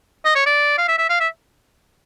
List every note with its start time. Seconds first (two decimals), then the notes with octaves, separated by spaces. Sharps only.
0.25 D#5
0.36 C#5
0.46 D5
0.78 F5
0.88 E5
0.99 E5
1.10 F5
1.20 E5